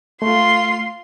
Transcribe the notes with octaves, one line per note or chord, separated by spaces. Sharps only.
A3 F4 C6